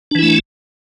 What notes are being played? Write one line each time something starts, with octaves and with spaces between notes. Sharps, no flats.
E3 A3 D4 E4